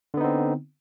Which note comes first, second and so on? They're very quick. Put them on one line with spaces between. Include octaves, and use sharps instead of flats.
D3 B3 D#4 C4